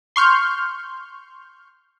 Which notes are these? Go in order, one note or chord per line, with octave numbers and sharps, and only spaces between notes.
C6 C#6 F6 G6